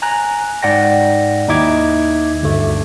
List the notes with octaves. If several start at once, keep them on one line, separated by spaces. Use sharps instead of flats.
G#5 A#5 F#6
G#2 D5 F#5 G5 A#6
D#2 D#4 E4 E5 D6 G#6
D2 G2 A3